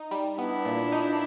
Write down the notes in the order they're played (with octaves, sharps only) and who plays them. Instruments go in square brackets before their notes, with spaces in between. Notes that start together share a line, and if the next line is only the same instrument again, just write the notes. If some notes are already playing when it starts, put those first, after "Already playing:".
Already playing: [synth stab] D#4
G3
[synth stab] B3 [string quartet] D4 E4
[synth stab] A#2
D#4